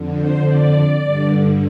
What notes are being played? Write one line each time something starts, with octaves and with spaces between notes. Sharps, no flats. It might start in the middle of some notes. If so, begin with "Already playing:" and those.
Already playing: F2 D3
C5
D5
G2 D3